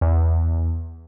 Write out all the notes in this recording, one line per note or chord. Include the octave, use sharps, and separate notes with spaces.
E2